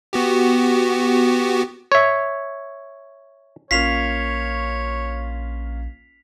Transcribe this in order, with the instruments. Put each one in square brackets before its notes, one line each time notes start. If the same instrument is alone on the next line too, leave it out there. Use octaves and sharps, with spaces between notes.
[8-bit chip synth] B3 F#4 G4
[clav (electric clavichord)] C#5 E5
[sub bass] A#1 [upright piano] A#3 C#4 F4 [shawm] C#5 [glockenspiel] B6 C7 F7